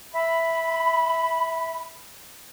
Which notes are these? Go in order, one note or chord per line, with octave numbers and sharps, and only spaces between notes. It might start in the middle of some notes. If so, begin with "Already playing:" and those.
E5 B5